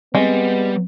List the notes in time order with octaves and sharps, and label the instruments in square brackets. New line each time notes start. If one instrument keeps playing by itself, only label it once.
[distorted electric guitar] G3 [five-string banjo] G#3 [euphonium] B3 [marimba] C4